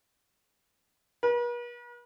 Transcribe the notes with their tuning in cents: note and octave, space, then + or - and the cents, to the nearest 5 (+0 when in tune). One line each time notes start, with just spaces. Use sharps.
B4 -45